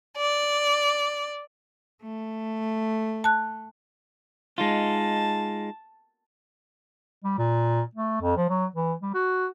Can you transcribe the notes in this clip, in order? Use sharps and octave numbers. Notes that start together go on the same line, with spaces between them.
D5
A3
A5 F#6
G#3 D#4 F4 A5
G3
A#2
A3
F2
F3
F#3
E3
G3
F#4